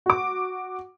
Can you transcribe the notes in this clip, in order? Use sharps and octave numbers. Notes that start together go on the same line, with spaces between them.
F#4 D6